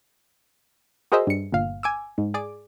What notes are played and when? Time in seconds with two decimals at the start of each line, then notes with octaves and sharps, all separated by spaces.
1.12 F#4 G#4 A#4 C5 D#5 E5
1.27 G2 C#7
1.52 G1 A#2 F5
1.83 G#5 D6 E6
2.18 G#2
2.34 G#4 D5 D6